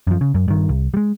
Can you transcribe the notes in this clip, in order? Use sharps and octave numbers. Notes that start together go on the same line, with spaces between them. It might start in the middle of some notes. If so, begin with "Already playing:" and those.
F#2 F3
C#3
F#2
G2 D#3
C2
G3 G#3